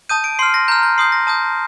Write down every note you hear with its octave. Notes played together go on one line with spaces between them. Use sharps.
A5 D#6 G6 D#7
D7
C6 F6 C7
A#6
A#5 F6 G6
G6
C6 D#6 G6 C7
A#6
A5 D#6 G6